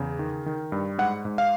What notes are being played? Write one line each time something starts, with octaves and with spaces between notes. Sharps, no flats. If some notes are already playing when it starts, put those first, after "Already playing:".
Already playing: E2 C#3
D#3
D#3
G2
G#2 F#5
G#2
F5